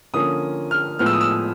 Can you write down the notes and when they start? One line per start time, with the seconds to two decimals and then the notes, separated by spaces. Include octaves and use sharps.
0.14 D3 F3 A#3 C#4 D#6
0.71 F6
0.99 A2 F3 G#3 B3 F6
1.06 E6
1.13 D#6
1.21 E6